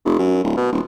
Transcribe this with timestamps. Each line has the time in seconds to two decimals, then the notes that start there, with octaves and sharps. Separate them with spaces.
0.05 F1
0.19 F#2
0.44 D1
0.57 B2
0.72 D#1